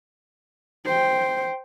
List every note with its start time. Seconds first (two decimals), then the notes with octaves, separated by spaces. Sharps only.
0.85 C5 G5